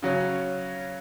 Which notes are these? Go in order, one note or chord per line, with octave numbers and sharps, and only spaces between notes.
C#3 F#3 C#4